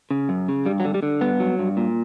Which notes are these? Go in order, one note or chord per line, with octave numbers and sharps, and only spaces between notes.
C#3
F#2
C#3
G2 G3
F#3
D3
G3
D3
G2 B3
F#3
G2
A#2